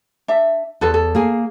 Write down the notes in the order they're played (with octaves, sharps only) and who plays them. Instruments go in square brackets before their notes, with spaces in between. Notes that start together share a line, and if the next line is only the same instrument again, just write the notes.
[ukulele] D4 E5
[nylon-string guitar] E2 [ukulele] F4 A4 B4
[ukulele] A4
[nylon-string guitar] A#3 G#4 G#5